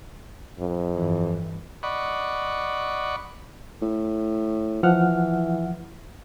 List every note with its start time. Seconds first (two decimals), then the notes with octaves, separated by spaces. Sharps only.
0.59 F2
0.95 G2 E3
1.83 D5 D#5 F#5 B5 C#6
3.82 A2
4.83 E3 F3 F#5 F6